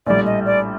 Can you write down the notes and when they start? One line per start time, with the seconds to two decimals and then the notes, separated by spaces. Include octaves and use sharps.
0.06 A#1 A2 G3 D5
0.26 D#5
0.46 D5